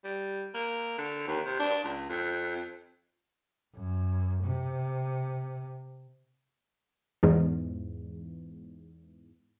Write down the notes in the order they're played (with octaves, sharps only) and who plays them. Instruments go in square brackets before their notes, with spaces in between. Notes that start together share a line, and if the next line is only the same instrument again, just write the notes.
[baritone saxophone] G3
A#3
D3
D#2
C3
D4
C#2
F2
[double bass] F#2
C3
[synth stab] E2 G#2